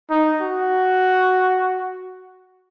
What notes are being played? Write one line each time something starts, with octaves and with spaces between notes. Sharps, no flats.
D#4
F#4